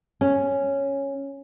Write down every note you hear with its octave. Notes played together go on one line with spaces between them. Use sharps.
C#4